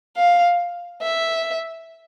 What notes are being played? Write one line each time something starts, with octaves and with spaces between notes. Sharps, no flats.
F5
E5